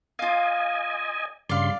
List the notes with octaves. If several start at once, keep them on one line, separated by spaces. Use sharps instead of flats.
F4 D#5 F5 G#5
G2 C#3 D5 F5 C6